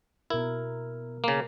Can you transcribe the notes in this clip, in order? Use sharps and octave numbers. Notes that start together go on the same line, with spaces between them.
B2 E4 A#4
C#3 A#3